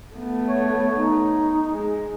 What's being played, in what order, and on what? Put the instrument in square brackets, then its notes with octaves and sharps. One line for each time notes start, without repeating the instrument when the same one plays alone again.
[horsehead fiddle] A3 B3
[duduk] C#5
D#4
[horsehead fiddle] G#3